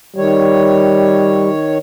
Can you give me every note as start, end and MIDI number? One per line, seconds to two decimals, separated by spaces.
0.17 1.78 51
0.17 1.50 55
0.17 1.78 73